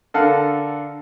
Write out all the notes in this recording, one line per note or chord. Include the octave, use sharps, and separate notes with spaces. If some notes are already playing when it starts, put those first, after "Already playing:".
D3 A4 A#4 F5 F#5